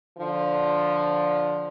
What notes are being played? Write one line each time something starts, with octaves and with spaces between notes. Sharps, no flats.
D3 F3